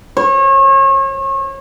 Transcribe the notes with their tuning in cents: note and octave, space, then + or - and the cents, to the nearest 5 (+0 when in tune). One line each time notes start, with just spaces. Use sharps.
C#5 -35